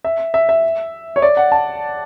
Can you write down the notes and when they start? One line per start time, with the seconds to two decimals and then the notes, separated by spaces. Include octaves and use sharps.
0.05 E5
0.34 E5
0.49 E5
1.16 C#5
1.22 D5
1.37 F#5
1.52 A5